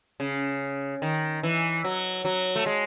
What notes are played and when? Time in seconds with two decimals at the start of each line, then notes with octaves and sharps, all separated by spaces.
0.20 C#3
1.02 D#3
1.43 E3
1.84 F#3
2.25 F#3
2.56 A3
2.66 G#3